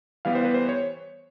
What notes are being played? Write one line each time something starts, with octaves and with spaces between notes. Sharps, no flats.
E3 G3 B3 F5
C5
B4
C5
C#5